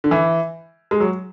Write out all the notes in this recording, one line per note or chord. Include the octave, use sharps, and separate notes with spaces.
D3
E3
G#3
F#3